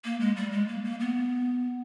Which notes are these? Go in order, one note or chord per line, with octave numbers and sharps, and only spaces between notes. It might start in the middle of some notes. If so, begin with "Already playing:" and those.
A#3
G#3
G3
G#3
A#3
A#3
B3